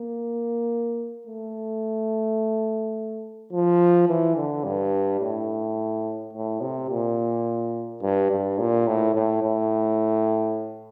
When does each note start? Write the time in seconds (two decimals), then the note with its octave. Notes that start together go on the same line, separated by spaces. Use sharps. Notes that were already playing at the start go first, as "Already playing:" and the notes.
Already playing: A#3
1.27 A3
3.53 F3
4.08 E3
4.37 D3
4.65 G2
5.20 A2
6.33 A2
6.61 C3
6.90 A#2
8.02 G2
8.31 G2
8.59 A#2
8.87 A2
9.14 A2
9.43 A2